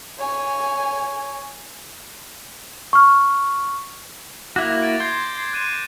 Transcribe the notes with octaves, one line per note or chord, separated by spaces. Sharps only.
C#5 G#5
C#6 F6
A#3 E4 F#4 D6 G#6 A#6
A6 D7
C6 G6 G#6 C7
F#6 D#7 E7